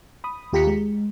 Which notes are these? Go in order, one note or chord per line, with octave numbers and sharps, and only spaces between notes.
B5 D#6
D#2 F4 G4 A#5 B6 C#7
G#3